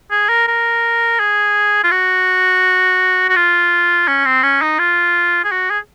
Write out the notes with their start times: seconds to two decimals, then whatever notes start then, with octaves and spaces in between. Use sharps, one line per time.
0.11 G#4
0.29 A#4
0.48 A#4
1.20 G#4
1.84 F4
1.91 F#4
3.29 F#4
3.36 F4
4.08 C#4
4.25 C4
4.43 C#4
4.62 D#4
4.79 F4
5.44 G#4
5.52 F#4
5.70 G#4